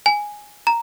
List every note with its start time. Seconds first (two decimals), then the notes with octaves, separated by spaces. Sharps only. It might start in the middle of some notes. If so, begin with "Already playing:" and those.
0.06 G#5
0.67 A#5